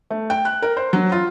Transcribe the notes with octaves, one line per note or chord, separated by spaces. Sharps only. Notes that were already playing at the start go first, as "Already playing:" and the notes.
A3
G5
F#6
A#4
C5
F#3
F4